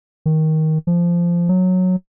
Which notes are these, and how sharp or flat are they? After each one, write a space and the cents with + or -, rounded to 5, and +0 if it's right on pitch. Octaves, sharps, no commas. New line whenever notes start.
D#3 +15
F3 -15
F#3 -10